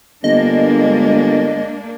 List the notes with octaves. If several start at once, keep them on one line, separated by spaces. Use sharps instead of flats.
G1 G#3 A#3 D4 D#5